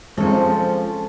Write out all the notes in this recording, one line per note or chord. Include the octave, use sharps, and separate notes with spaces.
F3 G#3 C4 C#4 A4 C#5